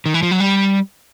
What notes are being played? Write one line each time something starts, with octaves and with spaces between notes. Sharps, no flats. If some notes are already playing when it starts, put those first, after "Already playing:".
D#3
E3
F3
F#3
G3